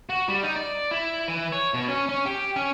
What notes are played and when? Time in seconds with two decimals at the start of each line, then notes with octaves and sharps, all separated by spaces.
0.09 F#4
0.28 G3
0.43 D#4
0.56 D5
0.91 E4
1.28 E3
1.52 C#5
1.74 B2
1.88 C#4
2.09 C#4
2.25 G4
2.56 C#4